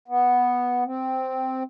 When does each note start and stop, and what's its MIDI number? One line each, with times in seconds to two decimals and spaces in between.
0.08 0.84 59
0.86 1.63 60